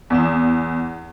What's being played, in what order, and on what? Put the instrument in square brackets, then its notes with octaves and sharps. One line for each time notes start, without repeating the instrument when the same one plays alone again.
[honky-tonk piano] E2 E7